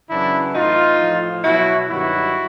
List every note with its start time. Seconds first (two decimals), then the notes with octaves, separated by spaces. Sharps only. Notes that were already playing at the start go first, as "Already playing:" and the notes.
0.10 F#2 C#3 E3 D4 E4
0.55 A2 E3 D#4 F4
1.00 A2 F3
1.44 B2 F#3 E4 F#4
1.89 G2 D#3 F#3 E4 F#4